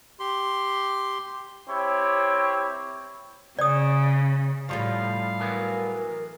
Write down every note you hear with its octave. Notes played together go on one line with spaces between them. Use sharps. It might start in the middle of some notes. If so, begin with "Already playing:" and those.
G4 C6
C4 E4 G4 C#5
C#3 D5 D#6
A2 F3 G3 C#4 F5
E3 F#3 B3 A#4